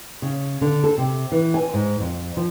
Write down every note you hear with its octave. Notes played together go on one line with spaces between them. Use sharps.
C#3
D3
A4
C3
E3
G#5
G#2
F2
F3